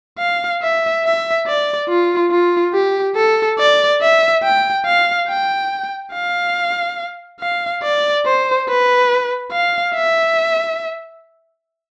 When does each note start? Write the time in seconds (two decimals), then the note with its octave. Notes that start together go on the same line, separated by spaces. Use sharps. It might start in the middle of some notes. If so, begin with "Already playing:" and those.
0.19 F5
0.62 E5
1.05 E5
1.47 D5
1.89 F4
2.31 F4
2.73 G4
3.16 A4
3.59 D5
4.01 E5
4.43 G5
4.85 F5
5.28 G5
6.13 F5
7.40 F5
7.83 D5
8.26 C5
8.68 B4
9.52 F5
9.95 E5